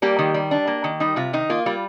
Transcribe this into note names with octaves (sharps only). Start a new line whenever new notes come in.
G3 A#3 G4
D#3
G3
D4
A#3
D#3
G3 D#4
C3 F4
D#3 D#4
A#3 F4
G3 F4